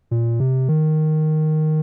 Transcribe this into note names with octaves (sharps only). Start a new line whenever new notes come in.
A#2
C3
D#3